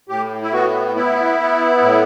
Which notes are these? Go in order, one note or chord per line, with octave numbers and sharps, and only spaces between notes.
A2 G4
E4
B3 F#4
B3 E4
B3
A2